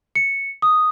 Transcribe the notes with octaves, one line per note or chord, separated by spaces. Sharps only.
C#7
D#6